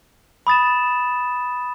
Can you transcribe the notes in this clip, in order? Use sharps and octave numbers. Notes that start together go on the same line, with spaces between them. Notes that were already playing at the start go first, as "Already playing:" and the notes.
B5 D#6 A6 E7